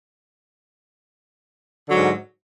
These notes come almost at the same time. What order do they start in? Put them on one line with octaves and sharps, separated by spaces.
D3 F#3 G#2